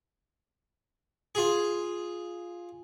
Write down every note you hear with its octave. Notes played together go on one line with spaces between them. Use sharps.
F4 G#4